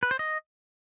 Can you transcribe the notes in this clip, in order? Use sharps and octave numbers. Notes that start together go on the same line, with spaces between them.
B4
C5
D#5